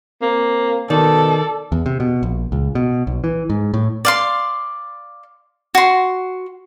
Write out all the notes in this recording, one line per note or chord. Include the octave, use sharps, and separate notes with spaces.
A#3 C4
B2 D#3 A4 D5
E2
C3
B2
A#1
C#2
B2
B1
E3
G#2
A2
D5 F5 C6
F#4 C6